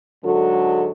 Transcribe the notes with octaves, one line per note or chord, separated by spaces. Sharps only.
G#2 D3 F#3 G#3 F#4 A4